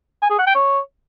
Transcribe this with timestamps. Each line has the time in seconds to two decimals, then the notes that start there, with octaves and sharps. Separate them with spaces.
0.22 G#5
0.30 G#4
0.39 F#5
0.47 G5
0.55 C#5